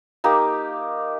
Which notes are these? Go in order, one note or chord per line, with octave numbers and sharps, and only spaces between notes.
A#3 D#4 G4